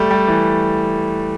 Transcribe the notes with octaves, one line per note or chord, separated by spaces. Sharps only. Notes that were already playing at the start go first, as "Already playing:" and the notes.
Already playing: G3 A3
G3
E3